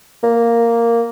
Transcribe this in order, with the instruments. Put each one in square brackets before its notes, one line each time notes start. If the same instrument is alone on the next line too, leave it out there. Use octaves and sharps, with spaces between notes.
[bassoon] A#3